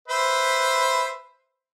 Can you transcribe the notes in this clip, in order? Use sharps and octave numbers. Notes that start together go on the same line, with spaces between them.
B4 C5 E5